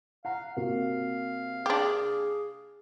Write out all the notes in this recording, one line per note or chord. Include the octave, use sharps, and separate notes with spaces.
F5 F#5 A#5
C3 A#3 F#4 F5
D4 G4 G#4